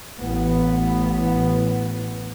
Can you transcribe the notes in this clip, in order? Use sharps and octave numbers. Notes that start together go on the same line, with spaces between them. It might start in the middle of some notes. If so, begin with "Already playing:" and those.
A1 B3